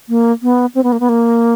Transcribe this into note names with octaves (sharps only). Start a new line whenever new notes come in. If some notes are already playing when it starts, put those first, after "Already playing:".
A#3
B3
C4
B3
A#3
B3
A#3